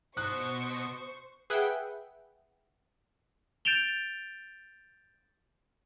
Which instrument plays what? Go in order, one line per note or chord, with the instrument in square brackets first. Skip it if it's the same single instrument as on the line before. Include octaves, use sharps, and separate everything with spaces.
[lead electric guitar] B2 [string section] C5 C#6 [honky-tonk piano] F#6
[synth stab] G#4 B4 E5 F#5 G5
[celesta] G6 A6 D7 E7 F7 G7